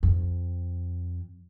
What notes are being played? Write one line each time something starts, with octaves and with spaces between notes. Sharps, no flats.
F2